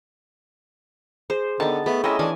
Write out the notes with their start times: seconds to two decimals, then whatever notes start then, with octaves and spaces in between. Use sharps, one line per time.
1.30 G#4 C5
1.60 D3 D#3 B3 A5
1.86 A3 B3 G#4
2.04 C3 C#4 E4 D#5 F5
2.19 E3 D4 G#5